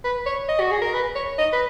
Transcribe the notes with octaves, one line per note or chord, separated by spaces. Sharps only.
B4
C#5
D#5
F#4
G#4
A#4
B4
C#5
D#5
B4